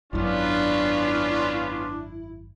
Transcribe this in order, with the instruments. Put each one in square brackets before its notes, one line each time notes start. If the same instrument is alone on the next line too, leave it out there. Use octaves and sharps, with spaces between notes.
[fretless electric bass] G#1 F#2 [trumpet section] B3 C#4 F4 [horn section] D4 [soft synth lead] E4